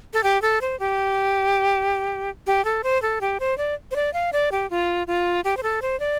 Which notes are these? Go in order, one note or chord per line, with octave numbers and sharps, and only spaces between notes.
A4
G4
A4
C5
G4
G4
A4
C5
A4
G4
C5
D5
C5
D5
F5
D5
G4
F4
F4
G4
C5
A4
C5
D5